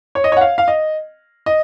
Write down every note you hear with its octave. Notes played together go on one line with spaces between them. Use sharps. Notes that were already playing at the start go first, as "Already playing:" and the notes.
C#5
D#5
C#5
F#5
F5
F5
D#5
D#5